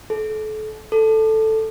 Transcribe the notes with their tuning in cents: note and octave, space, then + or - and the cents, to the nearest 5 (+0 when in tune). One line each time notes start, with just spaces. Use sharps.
A4 -35
A4 +0